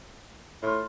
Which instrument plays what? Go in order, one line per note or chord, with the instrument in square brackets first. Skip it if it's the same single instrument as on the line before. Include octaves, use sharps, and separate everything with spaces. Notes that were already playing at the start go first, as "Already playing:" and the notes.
[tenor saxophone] A2 [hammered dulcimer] F4